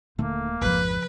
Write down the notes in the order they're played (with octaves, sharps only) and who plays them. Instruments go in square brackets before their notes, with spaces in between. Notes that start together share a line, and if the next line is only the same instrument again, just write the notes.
[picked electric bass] D#1 A3 [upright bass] D3 D#4 [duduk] A#3
[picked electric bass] A1 F2 G#2 [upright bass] C#3 F3 [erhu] B4